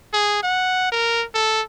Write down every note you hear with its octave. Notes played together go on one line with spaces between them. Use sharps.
G#4
F#5
A#4
A4